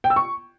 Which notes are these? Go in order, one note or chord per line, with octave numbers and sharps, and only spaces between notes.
G5
E6
C#6